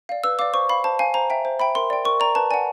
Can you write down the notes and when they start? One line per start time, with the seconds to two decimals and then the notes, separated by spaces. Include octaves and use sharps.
0.09 D5 F5
0.24 B4 E6
0.39 D5 F5 D6
0.53 C5 C#6
0.69 F5 B5
0.84 C5 A5
0.99 F5 G#5
1.14 C5 A#5
1.30 E5 G5
1.45 C5
1.60 E5 G5 B5
1.75 A#4 C6
1.90 D5 G5
2.05 A#4 C#6
2.20 D5 G5 A#5
2.35 B4 A5
2.51 D5 F#5 G#5